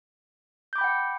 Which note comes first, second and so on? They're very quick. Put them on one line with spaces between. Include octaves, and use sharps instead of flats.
G6 D6 B5 G5 F#5